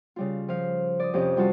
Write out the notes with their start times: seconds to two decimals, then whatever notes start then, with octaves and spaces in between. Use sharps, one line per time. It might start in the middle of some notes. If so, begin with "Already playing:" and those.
0.16 C#3 G3 F4
0.48 F3 F5
1.00 D5 D#6
1.14 F2 C3 C#4 G4
1.37 G3 F4 F#4 A5